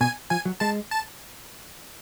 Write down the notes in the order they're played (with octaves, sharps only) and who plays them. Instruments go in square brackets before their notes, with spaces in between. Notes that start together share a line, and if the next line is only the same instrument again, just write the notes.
[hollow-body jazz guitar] B2 [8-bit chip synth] G#5
[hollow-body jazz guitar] F3 [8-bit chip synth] G#5
[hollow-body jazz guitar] F#3
[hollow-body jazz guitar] G#3 [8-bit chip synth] A5
[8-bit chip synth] A5